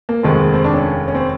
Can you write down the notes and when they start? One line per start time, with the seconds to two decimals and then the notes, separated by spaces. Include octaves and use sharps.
0.09 A#3
0.23 F1 D#2 D#3 G#3 C4
0.54 C4
0.64 D4
0.74 C#4
1.08 C#4
1.15 C4